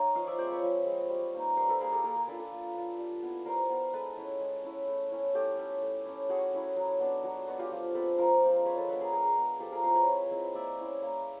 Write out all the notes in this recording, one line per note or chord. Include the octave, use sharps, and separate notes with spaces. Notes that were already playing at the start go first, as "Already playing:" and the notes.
Already playing: A#3 D#4 C#5
F3 D#5 F5
D5 E5
G#3 C4 C5 D5
B4 C#5
F3
G#3 C4
G3
A#3 D#4
G3 A#4 C5
A4 B4
A#3 D#4 G#4 A#4
G4 A4
A#3 G#4 A#4
G#4 A#4
D4 F4 A4 B4
A4 B4
A#3
D4 F4
G3
B3 E4
G3 A#4 C5
B3 E4
G#3 A4 B4
C#4 E4
G#3
C#4 E4
A3
C#4 E4
A3 G4 A4
C#4 E4
A3
C#4 E4
A3 F#4 G#4
C#4 E4
F#3
B3 D4
F#3 F#4
B3 D4 F#4
F4 G4
F3
G#3 C4 A4 B4
F3 A#4 C5
G#3 C4
G#3 B4 C#5
A4 B4
B3 D4 A4 B4
G#4 A#4
G#3 G#4 A#4
B3 D4
F3 G4 A4
G#4 A#4
G#3 C4 E4 A#4 C5
B4 C#5
F3
G#3 C4 E4
A#3 D5 E5
C#4 E4
A#3